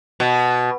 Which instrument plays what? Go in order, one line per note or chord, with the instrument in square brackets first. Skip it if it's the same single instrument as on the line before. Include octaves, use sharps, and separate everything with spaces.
[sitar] B2